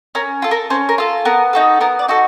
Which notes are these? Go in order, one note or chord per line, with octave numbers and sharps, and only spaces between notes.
C#4 A#4
F4 A4
A#4
C#4 C5
A#4
F4 A4
B3 A#4
D#4 F#4 A4
B3 A#4
D5
D#4 F#4 A4